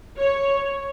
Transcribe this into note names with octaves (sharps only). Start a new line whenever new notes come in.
C#5